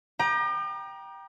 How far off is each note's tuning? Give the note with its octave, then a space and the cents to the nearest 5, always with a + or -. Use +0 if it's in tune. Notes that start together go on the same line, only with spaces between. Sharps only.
G5 +0 A#5 +30 D6 +45